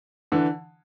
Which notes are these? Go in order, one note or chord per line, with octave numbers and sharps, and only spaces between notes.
D3 E3